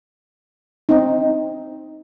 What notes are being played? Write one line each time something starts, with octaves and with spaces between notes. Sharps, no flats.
C4 D#4